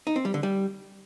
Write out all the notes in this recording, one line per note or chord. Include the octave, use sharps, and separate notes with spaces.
D#4
C4
G3
D3
G3